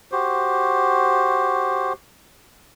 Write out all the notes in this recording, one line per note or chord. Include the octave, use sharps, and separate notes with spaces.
F#4 G4 C5